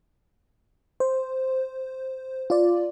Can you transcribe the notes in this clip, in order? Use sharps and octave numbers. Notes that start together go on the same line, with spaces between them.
C5
F4 D5